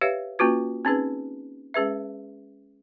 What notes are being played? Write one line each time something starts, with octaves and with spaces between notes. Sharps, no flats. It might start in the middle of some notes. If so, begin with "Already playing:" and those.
G4 B4 C#5 E5 F5
A#3 C#4 F4 F#4 B4
C4 C#4 D#4 G#4 B4
G#3 C#4 G#4 B4 E5